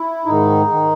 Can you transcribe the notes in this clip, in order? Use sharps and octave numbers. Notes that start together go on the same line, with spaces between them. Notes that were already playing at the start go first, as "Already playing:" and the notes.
Already playing: E4
G#2 D#3 D#4
D#3